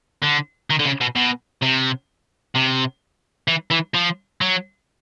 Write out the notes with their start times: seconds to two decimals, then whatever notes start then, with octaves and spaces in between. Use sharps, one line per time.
0.24 D3
0.70 D#3
0.79 D3
0.86 C#3
1.01 B2
1.16 B2
1.63 C3
2.56 C3
3.48 E3
3.71 E3
3.94 F3
4.41 F#3